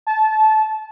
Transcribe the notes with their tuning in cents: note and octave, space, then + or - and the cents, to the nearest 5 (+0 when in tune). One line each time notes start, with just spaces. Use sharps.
A5 -20